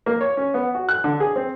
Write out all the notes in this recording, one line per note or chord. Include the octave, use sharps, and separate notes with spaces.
A#3
C#5
C#4
B3
F#4
F#6
D3
G#4
C4